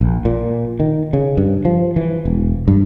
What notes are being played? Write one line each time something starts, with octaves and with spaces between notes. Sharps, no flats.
A#1
A#2
D#3
C#3
G2
F3
E3
E1
G2